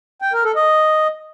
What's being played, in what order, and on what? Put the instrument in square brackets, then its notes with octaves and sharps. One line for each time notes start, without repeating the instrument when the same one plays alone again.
[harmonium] G5
A#4
A4
D#5